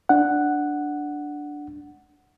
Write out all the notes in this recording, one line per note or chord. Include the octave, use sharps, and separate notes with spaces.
D4 F#5